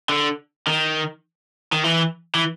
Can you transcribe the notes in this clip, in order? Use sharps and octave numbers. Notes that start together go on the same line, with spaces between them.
D3
D#3
D#3
E3
E3